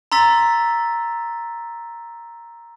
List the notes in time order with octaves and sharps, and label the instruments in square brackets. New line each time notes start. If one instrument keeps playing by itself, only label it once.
[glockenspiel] A#5 C6 E6 A6 B6